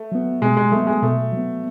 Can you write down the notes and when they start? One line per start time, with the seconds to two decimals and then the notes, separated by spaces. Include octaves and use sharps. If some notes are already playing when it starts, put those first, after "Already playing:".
Already playing: A3
0.12 F#3 B3
0.42 B2 G#3
0.57 G#3
0.72 F#3 A3 B3
0.87 G#3
1.02 B2 A3
1.32 F#3 B3